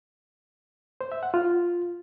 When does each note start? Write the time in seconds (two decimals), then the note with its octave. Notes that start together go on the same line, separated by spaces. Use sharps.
1.01 C5
1.12 E5
1.23 F#5
1.34 F4